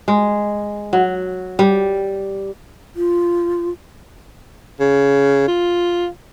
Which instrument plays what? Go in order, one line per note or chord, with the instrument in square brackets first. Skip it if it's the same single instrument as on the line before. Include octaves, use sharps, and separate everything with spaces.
[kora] G#3
F#3
G3
[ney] F4
[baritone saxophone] C#3
F4